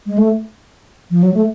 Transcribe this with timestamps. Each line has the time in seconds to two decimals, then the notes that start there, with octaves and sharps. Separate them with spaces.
0.06 G#3
0.18 A3
1.11 F3
1.23 F#3
1.34 A3